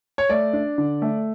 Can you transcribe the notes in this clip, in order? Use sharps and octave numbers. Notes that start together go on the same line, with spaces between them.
C#5
A3 D5
D4
D3
A3